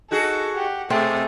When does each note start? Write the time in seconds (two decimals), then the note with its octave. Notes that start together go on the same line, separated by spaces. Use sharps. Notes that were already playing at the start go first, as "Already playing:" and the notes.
0.11 D#4 F#4 G#4 A4
0.54 G4 F#5
0.90 B2 A3 C4 G#4